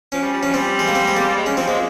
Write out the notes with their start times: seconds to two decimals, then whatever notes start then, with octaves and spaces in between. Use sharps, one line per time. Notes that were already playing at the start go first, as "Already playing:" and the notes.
0.12 F3 C#4
0.23 G3
0.33 G3
0.43 F3 C#4
0.53 G3 C4
0.79 G#3
0.88 A#3
0.95 C4
1.08 G#3
1.16 A#3
1.36 G#3
1.46 C#4
1.57 F3 C4
1.68 G#3 A#3